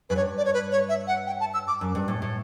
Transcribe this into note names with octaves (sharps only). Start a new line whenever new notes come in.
F#2 B4
G2 C#5
D5
C#5
B4
C#5
E5
F#5
G5
A5
E6
D6
F#2
G2
A2
A2